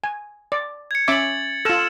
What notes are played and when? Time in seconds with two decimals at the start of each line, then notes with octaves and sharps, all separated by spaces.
0.04 G#5
0.52 D5
0.91 G#6 C#7
1.08 C#4 E5 D6 A6 F#7
1.65 F4 A4 E6 F6 E7